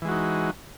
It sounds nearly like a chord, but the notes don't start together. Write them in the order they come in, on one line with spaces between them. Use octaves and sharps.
E3 G#3 F#4 D#4